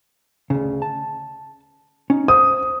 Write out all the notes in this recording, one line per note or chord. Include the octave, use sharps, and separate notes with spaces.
D2 C#3
A5
C#4 D#4
C5 D#6